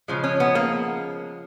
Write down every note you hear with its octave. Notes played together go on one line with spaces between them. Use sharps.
C#3 F3 G#3
C#4
B3
A#3